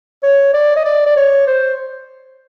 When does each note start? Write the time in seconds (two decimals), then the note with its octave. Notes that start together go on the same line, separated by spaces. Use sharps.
0.23 C#5
0.53 D5
0.76 D#5
0.85 D5
1.06 D5
1.16 C#5
1.47 C5